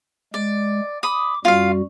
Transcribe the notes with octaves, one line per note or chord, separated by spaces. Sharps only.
G#3 D5
B5 D6 D#6
F#2 G3 F4 F#4 F5